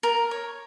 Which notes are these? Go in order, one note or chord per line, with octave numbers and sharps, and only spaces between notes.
A#4
C#5